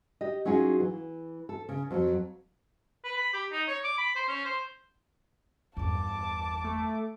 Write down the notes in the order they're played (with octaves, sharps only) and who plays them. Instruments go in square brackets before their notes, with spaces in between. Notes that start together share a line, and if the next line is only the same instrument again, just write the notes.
[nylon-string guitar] G4 D#5
F#3 C#4 D#4 F4 F#4 G#4
E3
A4
C#3
F2 F#3
[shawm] B4
B5
G4
D#4
C#5
D6
B5
C5
C#4
C5
[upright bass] G1 E2 [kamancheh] A5 D6
[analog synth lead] A3